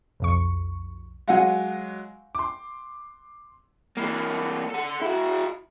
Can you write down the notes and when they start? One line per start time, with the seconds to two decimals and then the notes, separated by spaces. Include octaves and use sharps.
0.20 B1 F2 C#6
1.28 F#3 G#3 F5 F#5 G#5
2.35 C6 D6
3.97 E3 A#3
4.70 A4 F#5
5.02 E4 F#4